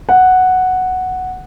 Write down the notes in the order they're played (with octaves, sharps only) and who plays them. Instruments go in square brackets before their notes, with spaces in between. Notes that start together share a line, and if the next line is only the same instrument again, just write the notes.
[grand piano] F#5